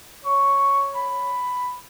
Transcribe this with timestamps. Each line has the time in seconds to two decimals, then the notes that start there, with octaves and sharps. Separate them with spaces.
0.25 C#5 C#6
0.95 B5